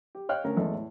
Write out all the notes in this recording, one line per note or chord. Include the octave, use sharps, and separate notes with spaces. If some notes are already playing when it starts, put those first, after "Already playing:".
G4
C#5 D#5 F5 G5 F6 F#6
D2 C#4 A#4
E2 G#3 A3
A2